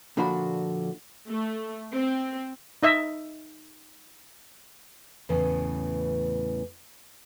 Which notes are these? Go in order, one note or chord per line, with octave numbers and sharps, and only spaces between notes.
A#2 D3 F3 D4 F#4 B5
A3
C4
D#4 D#5 E5
E2 A2 C#3 E3 C#4